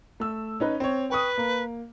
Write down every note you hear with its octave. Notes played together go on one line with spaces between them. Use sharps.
A3 E6
C#4 D#4 B4
C4 C#5
B4 G5 C#6 D#6
A#3